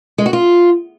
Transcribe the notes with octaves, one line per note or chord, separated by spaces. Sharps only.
G#3
F#4
F4